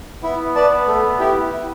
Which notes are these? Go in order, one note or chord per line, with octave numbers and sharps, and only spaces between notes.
B3 E4
B4 D5 A5
A3
E4 G4
E4